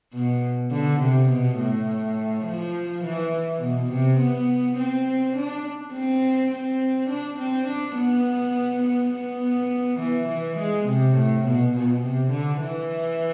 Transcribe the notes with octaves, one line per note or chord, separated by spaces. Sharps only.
B2
D3
C3
B2
A2
F3
E3
B2
C3
B3
C4
D4
C4
C4
D4
C4
D4
B3
B3
B3
E3
E3
G#3
C3
A2
B2
B2
C3
D3
E3